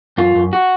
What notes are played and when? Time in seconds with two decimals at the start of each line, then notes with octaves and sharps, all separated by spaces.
0.18 F#2 F4
0.35 F#2
0.53 F#4